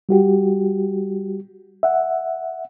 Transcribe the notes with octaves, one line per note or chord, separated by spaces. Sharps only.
G3 F#4 G4
E5 F#5